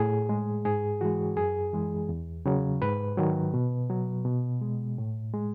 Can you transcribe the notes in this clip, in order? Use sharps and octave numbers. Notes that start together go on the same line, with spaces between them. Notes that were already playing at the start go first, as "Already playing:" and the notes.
Already playing: A2 G#4
G#3
G#2 G#4
E3 G#3 F#4
F#2 G#4
E3 G#3
E2
C#3 F#3
G#2 B4
D#3 F#3
B2
F#3
B2
G#3
A2
G#3